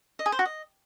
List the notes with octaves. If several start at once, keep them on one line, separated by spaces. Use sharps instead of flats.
D#5
G#4
C5
F#4
D#5